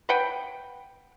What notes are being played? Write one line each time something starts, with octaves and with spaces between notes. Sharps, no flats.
B4 F#5 G5